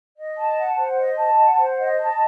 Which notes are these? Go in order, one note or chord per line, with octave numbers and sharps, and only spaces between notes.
D#5
A5
F#5
C5
D#5
A5
F#5
C5
D#5
A5